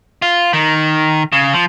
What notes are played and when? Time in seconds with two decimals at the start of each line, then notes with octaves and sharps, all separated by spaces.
0.22 F4
0.53 D#3
1.32 C#3
1.53 F3